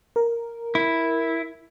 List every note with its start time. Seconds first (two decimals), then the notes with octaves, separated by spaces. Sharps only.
0.16 A#4
0.75 E4